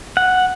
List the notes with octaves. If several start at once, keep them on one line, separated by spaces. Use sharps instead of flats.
F#5